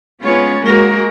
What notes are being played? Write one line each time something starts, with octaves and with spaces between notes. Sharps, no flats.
G#3 B3 C#4 F4 C#5
G#3 A#3 F#4 A#4